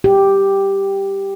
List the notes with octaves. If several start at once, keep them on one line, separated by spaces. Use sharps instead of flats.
G4